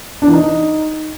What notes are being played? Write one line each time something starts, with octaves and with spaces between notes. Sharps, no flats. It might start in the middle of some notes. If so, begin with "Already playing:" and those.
D4
E3
D#4